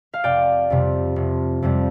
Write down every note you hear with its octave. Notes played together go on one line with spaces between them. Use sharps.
F5
F1 D5 G5
F2 C3 G3
F1
F2 C3 G3